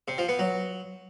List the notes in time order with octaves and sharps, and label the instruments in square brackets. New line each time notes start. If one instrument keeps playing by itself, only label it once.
[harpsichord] C3
F3
B3
F#3